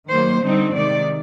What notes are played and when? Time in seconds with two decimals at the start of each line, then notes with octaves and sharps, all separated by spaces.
0.10 D#3 F#3 A#3 C5
0.43 D3 G3 C4 D#4
0.74 C3 D#3 G#3 D5